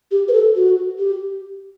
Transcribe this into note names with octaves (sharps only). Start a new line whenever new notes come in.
G4
B4
A4
F#4
G4